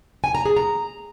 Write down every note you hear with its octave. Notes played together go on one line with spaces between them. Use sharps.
G#5
A#5
G#4
A#5